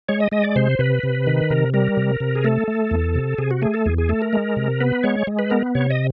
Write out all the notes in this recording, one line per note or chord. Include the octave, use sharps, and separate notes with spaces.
G#3 C#5
D#5
G#3 D#5
D5
C3 C5
C3 B4
C3
D#3
C3 A#4
G3 A#4
C3
C3
G#4
A3 A4
A3
E2
C3
C3 G#4
F#4
A3 G#4
A4
E2 G#4
G#4
A3 A4
A#4
G#3
C3
B3 B4
G#3 C#5
G#3
B4
B3 A#4
C3 C#5
D#5